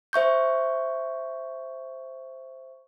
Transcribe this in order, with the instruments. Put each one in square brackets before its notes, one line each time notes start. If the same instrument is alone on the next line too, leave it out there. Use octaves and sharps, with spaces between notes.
[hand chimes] C5 E5 C#6 G6